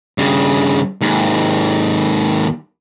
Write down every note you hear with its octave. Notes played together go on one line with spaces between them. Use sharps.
G2 C#3
D#2 G#2